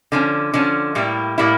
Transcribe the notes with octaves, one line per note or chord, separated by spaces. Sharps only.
D3 F3 C#4
D3 F3 C#4
A2 G3 A#3 E4
A2 G3 A#3 E4